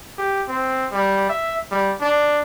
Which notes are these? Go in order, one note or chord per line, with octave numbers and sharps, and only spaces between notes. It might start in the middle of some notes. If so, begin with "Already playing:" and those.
G4
C4
G3
E5
G3
D4